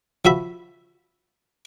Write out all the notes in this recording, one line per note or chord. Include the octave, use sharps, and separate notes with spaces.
F3 F#4 E5 B5